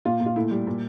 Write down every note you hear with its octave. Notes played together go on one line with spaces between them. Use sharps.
A#2 F4
A#2
F4
A2 E4
G3
A#2